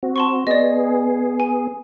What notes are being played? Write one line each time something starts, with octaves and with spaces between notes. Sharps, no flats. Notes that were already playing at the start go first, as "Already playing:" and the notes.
C4 F#4
A5 C6 C#6
B3 G#4 D5 D#5
G#5